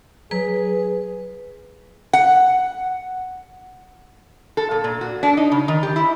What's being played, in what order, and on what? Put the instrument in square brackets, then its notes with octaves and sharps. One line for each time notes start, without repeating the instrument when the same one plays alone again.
[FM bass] F#3 [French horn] G#4 [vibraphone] B4
[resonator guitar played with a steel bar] F#5
A4
A#2
A#2
F#4
D4
D#4
C#3
D#3
G4
E4